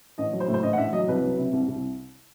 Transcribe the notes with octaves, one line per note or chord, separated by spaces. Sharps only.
A1 D#5
F#3
C5
A2
C5
A1 D#5
F#5
A1 E5
F#3 D#5
C2 B4
F#3
C3
C2
C2